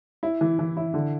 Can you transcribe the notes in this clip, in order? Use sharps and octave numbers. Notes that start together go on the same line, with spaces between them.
E4
E3
E3
E4
D3